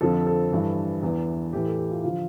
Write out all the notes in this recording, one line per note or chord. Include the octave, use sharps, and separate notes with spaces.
F2 D3 F3 A4
A4
G2 E3
E2 E3
A2 E3 G4
A4
G4
F4
D3 F3 F4